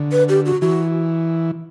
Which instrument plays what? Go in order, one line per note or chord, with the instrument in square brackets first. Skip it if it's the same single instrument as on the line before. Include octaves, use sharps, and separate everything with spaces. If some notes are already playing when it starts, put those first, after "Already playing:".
Already playing: [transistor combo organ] D3
[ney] B4
G4
F#4
[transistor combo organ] E3 [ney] F#4